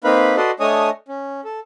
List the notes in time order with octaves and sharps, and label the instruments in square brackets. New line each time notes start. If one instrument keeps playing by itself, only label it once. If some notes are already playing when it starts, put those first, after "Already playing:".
[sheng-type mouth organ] A#3 C4 D#4 B4 F5 B5
F#4 A4 B4 D5 D#5 C6
A3 D4 C#5 D#5 G#5 D#6
C#4
A4